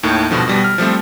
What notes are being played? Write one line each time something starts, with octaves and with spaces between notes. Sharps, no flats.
D#2 A2 D#3
G2 B2 D3 F3
B2 G3 B3
F6
F3 G3 A3 C4